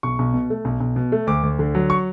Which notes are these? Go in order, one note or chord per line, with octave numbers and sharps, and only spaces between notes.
B1 C#6
B1
B2
A3
B1
B1
B2
A3
D2 D6
D2
D3
F#3
C#6